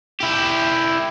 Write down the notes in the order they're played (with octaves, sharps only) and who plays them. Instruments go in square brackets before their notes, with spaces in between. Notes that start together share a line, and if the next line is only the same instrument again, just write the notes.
[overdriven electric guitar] E4 G4